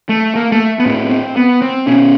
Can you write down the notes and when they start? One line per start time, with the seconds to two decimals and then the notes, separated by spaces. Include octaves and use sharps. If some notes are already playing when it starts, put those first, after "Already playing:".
0.09 A3
0.35 A#3
0.52 A3
0.79 B3
0.86 A2 C4
1.11 C4
1.36 B3
1.62 C4
1.87 B2 C#4